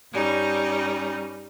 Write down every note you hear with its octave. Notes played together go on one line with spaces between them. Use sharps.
G2 G3 C#4 D#4